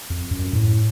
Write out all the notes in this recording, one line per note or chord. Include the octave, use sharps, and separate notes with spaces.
F2
F#2
A2